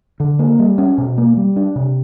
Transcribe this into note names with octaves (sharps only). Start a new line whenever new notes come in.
D3
A#3
G3
C#4
B2
A#3
G3
D4
C3